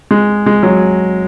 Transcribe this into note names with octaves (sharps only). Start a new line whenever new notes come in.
G#3
G#3
F#3